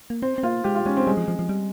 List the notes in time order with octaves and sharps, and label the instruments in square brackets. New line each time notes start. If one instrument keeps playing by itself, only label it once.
[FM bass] A#3
[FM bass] C4 [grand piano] C5
[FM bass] C4
[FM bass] A#3 [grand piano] F4
[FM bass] G#3 [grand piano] G4
[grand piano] F4
[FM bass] G#3 [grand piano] C#4
[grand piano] C4
[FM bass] G3 [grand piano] G#3
[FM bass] F3
F3
F3
G3